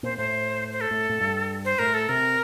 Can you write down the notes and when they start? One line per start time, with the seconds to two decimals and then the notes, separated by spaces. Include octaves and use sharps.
0.03 A#2 C5
0.18 A2 C5
0.72 C5
0.82 A4
0.91 A2
1.09 A2
1.21 G2
1.65 C5
1.79 A2 A#4
1.94 A4
2.09 C3 A#4